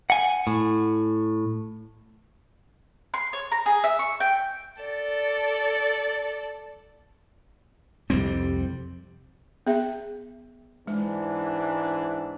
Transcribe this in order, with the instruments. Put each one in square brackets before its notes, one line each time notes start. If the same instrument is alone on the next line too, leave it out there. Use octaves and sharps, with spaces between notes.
[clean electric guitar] F#5 G#5
A2
[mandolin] C6
C#5
A#5
G#4
E5
C#6
G5
[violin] A4 D5
[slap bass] C2 F2 G3 C4
[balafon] B3 G#4 E5
[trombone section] G#2 E3 D4 [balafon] G#3